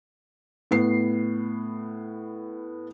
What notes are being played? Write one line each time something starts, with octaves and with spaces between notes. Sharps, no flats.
A2 B3 C7